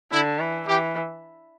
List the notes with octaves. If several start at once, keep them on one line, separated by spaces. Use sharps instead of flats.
D3 E4
E3
E3 G4